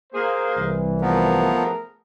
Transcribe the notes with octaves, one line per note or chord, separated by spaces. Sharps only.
A#3 G#4 C5
C2 E3
F3 A3 B3 G#4 A#4